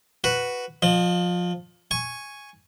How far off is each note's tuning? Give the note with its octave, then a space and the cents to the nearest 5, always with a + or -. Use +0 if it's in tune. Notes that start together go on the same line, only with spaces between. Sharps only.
F#4 +0 B4 +0
F3 +20 D#5 -35
G#5 +0 C#6 +0